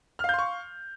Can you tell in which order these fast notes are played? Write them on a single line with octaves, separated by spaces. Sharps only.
F6 F5 G6 C6 C#6